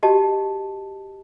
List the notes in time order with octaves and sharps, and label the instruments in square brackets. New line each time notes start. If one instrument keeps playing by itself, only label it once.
[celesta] F#4 G4 D#5 A5